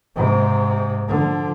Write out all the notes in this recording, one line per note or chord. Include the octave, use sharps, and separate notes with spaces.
G#2 C3
D3 F3